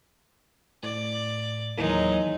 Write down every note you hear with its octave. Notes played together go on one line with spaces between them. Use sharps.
A2 D5
D#2 E3 F#3 G#3 A#3 D#4